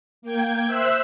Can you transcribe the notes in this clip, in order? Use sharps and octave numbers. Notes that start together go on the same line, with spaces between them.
A#3 G5 G#6
C5 E5 E6 F#6